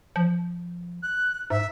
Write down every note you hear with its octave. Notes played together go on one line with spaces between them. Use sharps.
F3
F#6
G#2 E5